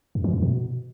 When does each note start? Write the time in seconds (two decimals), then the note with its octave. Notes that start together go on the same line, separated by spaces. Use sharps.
0.15 F#2
0.24 E3
0.33 F#2
0.42 B2